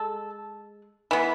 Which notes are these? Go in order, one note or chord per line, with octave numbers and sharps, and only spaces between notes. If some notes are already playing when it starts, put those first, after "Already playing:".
Already playing: G#3 A4
E3 B3